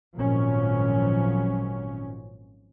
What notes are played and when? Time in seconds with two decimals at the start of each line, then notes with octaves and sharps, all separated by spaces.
0.16 G#1 A#2 F3 F#3 C#4